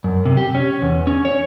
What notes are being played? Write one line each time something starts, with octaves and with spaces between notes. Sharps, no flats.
F#2
C3
G4
C#4
E2
C#4
C#5